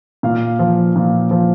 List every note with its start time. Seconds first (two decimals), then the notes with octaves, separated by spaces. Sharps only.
0.23 A#2 F5
0.59 F3
0.96 A#2
1.31 F3